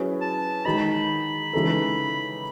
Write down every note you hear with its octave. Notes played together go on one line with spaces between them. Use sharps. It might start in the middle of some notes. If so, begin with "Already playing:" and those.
Already playing: F#3 C#4 E4 G#4 B4
A5
D#3 G#3 D#4 B5
C#3 E3 G#3 D#4 A4